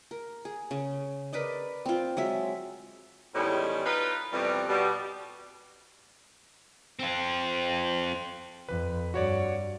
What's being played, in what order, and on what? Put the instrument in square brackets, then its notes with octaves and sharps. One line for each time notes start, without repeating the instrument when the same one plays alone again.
[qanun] A#4
G#4
C#3
A#4 B4 D5 D#5
C4 F4
F#3 G#3 E5
[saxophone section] E2 A2 D#3 G3 G#3 C#4
D#4 F4 B4
F2 B2 E3 G3
B2 G3
[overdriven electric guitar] C4 F4
[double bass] F2 [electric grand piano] B4
[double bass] G2 [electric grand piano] F#4 C#5 D5